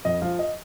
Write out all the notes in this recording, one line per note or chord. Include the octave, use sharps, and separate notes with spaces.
F2 D#5
F3 F5
D#5